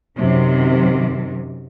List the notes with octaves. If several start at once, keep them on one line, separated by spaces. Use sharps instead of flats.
F#2 C3 D#3